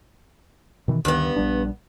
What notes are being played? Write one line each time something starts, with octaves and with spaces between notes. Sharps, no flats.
B2 D#3 E3
D2 G2 D#3 B3
A#1 G3 D4